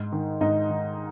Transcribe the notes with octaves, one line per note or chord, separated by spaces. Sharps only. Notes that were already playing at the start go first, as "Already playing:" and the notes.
Already playing: G#2
D#3
G#2 D#4
D#3